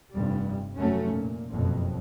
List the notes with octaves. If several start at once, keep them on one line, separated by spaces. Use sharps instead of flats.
F1 G2 G3
F1 F#3 A3 C#4
A#2
F#1 F2 B2